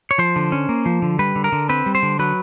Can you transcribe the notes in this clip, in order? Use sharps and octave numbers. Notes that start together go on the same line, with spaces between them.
C#5
F3 C5
D3
C#4
A#3
F3
D3
G3 B4
D3
A#4
D3
C4 B4
G3
C5
D3
F#3 B4